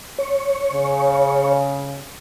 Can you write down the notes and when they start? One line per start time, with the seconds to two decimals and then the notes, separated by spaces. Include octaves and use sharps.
0.18 C#5
0.72 C#3